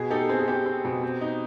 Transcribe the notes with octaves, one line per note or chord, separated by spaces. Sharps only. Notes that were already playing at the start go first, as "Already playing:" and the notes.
Already playing: B2 G#4
D#4 G4 A4
C4 G#4
G#4
C4 G4
C4
B2
C4
D#4